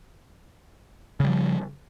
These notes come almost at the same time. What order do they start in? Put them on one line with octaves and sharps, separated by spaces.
C#3 G3 F3